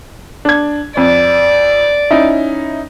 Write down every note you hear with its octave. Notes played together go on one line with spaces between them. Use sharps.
D4 G#6
F2 D5
C#4 D#4 E4